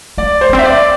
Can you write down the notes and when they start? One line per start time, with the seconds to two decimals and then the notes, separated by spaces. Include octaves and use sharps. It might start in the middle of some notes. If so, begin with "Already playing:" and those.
0.18 A3 D5
0.41 C5
0.49 A3
0.53 C4
0.59 E5
0.65 D5